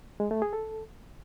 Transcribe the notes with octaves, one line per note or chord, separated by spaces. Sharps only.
G#3
A3
G#4
A4